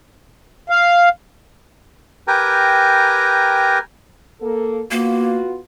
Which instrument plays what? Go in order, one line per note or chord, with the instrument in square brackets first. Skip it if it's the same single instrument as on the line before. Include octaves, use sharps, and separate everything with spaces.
[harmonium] F5
[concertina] G4 A#4 B4 G5 G#5 A#5
[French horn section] A#3 A4
[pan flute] A#3 [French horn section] B3 F4 F#4